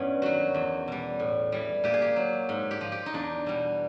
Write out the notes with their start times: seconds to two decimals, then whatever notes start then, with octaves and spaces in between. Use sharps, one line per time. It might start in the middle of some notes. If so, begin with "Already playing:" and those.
Already playing: G2 E3 B3 C#4
0.22 D#3 F#3 F#4
0.54 E2
0.88 B2 G3
1.19 A2
1.52 E3 G3
1.84 A#2 G4
1.94 G#4
2.02 G4
2.16 F#3
2.49 G#2
2.71 G4
2.81 F3
2.92 G4
3.06 D#4
3.14 E2 D4
3.46 B2 G3